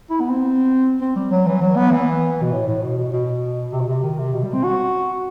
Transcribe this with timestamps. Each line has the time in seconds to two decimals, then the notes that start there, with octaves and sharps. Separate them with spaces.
0.10 E4
0.20 B3
0.30 C4
1.01 C4
1.16 G3
1.31 F#3
1.46 E3
1.61 F#3
1.77 B3
1.91 E3
2.42 B2
2.52 A2
2.67 A2
2.82 B2
2.98 B2
3.12 B2
3.73 C3
3.81 B2
3.88 C3
4.03 D#3
4.18 C3
4.33 B2
4.43 G3
4.53 C4
4.64 F#4